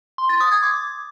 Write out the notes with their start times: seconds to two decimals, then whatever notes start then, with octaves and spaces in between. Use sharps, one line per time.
0.18 C6
0.29 A6
0.40 D#6
0.52 G#6
0.63 D6